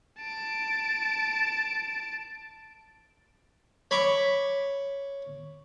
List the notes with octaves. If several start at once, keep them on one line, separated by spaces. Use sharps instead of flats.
A5 D7
C#5 B5 C#6 D6